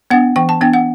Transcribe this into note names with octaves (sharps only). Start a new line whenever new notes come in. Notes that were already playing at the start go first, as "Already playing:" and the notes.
B3 D4 F#5
E3 G5
A5
B3 D4 G5
F#5